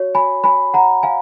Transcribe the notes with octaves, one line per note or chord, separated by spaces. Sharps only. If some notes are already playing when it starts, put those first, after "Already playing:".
Already playing: F#4 C#5
G#5 B5
G#5 B5
F#5 A#5
F5 G#5